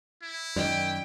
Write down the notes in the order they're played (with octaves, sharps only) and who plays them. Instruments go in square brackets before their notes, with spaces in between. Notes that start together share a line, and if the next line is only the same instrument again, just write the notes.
[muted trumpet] E4
[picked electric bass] F#2 D#3 [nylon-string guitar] D5 D#5 [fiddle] G5